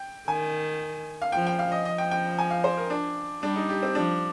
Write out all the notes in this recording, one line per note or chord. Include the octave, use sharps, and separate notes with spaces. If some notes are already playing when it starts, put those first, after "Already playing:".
Already playing: G5
D#3 G#5
F5
F3 G5
G5
F5
D#5
F3 D#5
G5
G5
G#5
F5
C5
A#4
D4
G3 D4
D#4
G4
C4
F3 D4